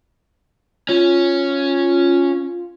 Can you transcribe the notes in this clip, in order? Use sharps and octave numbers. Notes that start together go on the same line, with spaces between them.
C#4 F4